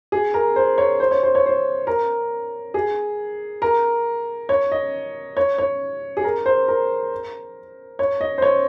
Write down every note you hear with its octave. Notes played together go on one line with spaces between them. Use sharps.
G#4
A#4
C5
C#5
C5
C#5
C5
C#5
C5
A#4
G#4
A#4
C#5
D#5
C#5
C#5
G#4
A#4
C5
A#4
C#5
D#5
C5
C#5